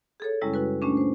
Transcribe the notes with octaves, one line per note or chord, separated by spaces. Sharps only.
G#4 A4 C#5
F#2 C#3 G3 G#3 C#4 E4
E4 F#4 B4
A#2 G#3 A3 C#4 D4
C5